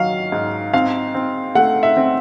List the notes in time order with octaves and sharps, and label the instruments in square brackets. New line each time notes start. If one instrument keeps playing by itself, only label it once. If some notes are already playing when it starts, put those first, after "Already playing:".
Already playing: [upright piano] D#3 F#3 F5
G#2
C4 F5
C4
A3 F#5
E5
C4